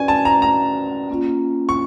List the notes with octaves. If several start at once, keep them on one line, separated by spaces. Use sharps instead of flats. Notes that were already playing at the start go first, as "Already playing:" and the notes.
Already playing: C#4 F#4 B4 D5 G#5
A5
A#5
A#5
A#3 C#4 F4
C#6